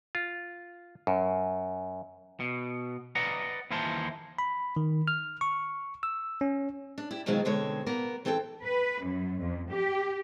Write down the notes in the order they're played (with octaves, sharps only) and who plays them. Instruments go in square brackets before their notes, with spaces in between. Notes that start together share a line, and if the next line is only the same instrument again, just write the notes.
[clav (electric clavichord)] F4
F#2
[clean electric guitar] B2
B4 D5 D#5 F#5 A#5
D#2 E3 E4 A#4 C5 A5
[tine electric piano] B5
D#3
F6
C#6
E6
C#4
[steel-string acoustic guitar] D4
E4 G4
B2 D#3 F#3 G#3 C4 F4
B2 D3 G#3 C4 C#5
A#3 B3 A#4
E3 C4 A4 F#5 G5
[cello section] B4
F#2
F2
G4